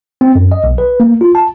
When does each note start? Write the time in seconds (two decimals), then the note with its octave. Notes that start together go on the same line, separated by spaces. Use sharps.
0.21 C4
0.35 F#2
0.52 D#5
0.64 B1
0.78 B4
1.00 A#3
1.21 F4
1.35 A5